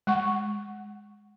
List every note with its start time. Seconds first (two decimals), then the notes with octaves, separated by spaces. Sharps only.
0.07 G#3 F#5 C#6